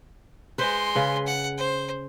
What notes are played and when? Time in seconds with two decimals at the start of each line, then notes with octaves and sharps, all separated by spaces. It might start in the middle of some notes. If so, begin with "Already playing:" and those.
0.58 G#3 B4 C5 C6
0.95 C#3 B4
1.26 F#5
1.57 C5